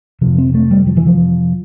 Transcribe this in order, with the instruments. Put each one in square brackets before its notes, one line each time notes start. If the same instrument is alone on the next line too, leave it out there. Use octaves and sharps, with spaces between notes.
[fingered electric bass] F2 C3 F3
C4
A3
G3
F3
E3
F3